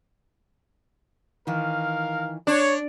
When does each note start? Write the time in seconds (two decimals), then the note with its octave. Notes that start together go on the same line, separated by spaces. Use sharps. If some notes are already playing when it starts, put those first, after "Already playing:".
1.47 D#3 E3 A#4 F5
2.47 D4 C#5